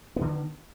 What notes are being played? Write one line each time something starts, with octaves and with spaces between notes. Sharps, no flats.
D3 D#3 B3